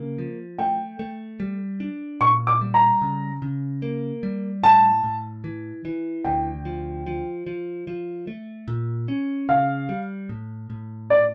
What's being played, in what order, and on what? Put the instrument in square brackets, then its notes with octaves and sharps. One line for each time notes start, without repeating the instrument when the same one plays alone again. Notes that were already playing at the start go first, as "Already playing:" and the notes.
Already playing: [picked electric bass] C#3 A#3
F3
[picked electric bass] A3 [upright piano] G5
[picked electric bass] A3
G3
D4
[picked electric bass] A#2 [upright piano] C#6
[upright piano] D6
[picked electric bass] G3
[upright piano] A#5
[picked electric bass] C#3
C#3
A#3
G3
[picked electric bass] A2 [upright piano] A5
[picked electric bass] A2
E3
E3
[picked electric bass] D2 [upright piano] G5
[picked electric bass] F3
F3
F3
F3
A3
A#2
C#4
[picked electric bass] C#3 [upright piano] F5
[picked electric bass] G3
A2
A2
[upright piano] D5